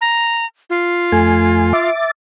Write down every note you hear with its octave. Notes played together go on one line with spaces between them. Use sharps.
A#5
F4
F2 A3 G#5
E5 D6 A6